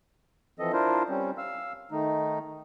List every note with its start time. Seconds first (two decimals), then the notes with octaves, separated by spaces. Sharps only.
0.59 E3 F3 C4 A4 D#5
0.73 D4 E4 F4 A#4 C5
1.10 G3 C4 C#4
1.38 F5 E6
1.91 D#3 A3 D#4